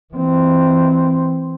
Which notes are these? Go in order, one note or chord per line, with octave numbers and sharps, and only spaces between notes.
E3 C4